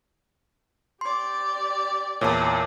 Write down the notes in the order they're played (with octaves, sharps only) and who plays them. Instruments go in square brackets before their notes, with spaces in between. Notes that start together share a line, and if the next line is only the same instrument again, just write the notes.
[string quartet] G4 D5 [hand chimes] C6
[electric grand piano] E2 A#2 [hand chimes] C#5 E5 A5